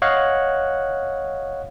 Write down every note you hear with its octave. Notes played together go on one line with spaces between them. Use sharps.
C#5 D#5 F5 F#5 F#6